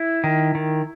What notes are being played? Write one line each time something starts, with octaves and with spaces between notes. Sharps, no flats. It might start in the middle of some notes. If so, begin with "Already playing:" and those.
Already playing: E4
D#3
D#3